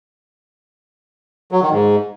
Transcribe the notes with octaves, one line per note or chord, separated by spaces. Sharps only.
F#3
D#3
G#2